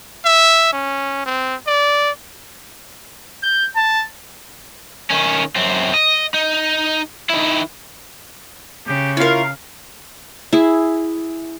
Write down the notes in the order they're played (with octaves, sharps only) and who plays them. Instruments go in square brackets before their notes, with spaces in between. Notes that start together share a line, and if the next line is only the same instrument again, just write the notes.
[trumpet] E5
C#4
C4
D5
[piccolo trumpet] G6
A5
[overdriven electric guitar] D#3 C#4
F#2 C4
D#5
D#4
D#3 E4
[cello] C#3 [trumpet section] G4
[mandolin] C#4 A#4 [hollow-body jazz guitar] E4 F4 [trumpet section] F5
[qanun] E4 G#4